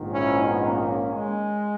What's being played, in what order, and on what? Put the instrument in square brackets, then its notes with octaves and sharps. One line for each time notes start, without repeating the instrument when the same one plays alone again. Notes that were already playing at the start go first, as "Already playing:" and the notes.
Already playing: [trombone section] A#1 G#2 D#3
C#4 E4
B3 D#4
A#3 C#4
G#3